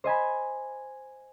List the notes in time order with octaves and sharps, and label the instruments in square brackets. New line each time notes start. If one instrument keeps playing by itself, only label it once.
[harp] C5 D#5 G#5 B5